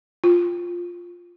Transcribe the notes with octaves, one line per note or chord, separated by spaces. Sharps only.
F4